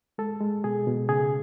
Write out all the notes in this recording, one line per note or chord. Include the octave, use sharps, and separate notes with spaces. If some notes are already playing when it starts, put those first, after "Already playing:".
G#3 A4
G#3
B2 G#4
B2
C#3 G#4